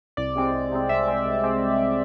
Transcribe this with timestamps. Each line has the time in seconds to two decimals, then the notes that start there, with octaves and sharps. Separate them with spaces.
0.17 C2 D5
0.35 C3 G#3 C4
0.53 C2
0.72 C3 G#3 C4
0.89 C2 E5
1.07 C3 G#3 C4
1.26 C2
1.44 C3 G#3 C4